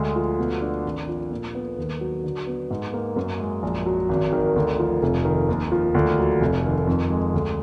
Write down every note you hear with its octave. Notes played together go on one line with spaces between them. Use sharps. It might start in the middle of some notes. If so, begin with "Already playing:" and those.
Already playing: D2 G#3
F3
B2
D4
G#1
F3
A#2
B3
D#2
F#3
D3
B3
G#2
A#3
F#2
G#3
A#1
F#3
G#1
D#3
D2
F3
F1
D#3
D#2
F3
D2
F#3
F1
D#3
F2
G#3
D2